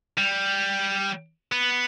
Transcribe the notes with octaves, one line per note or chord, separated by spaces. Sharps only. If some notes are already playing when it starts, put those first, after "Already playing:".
G3
B3